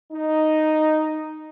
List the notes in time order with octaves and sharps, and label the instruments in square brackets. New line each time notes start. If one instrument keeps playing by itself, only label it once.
[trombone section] D#4